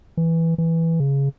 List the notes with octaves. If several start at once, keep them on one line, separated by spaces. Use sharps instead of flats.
E3
E3
C#3